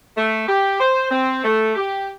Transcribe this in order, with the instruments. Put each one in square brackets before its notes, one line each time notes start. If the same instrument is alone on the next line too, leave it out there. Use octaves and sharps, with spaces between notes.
[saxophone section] A3
G4
C5
C4
A3
G4